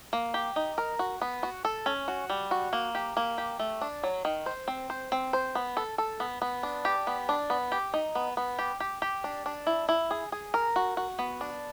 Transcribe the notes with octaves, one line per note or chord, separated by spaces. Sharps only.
A#3
G4
D#4
A#4
F#4
B3
F#4
A4
C#4
F#4
G3
F#4
A#3
G4
A#3
G4
A3
D4
F#3
D#3
C5
C4
C5
C4
C5
B3
A4
A4
B3
B3
D4
G4
B3
D4
B3
G4
D#4
B3
B3
G4
G4
G4
D4
D4
E4
E4
G#4
G#4
A#4
F#4
F#4
B3
D4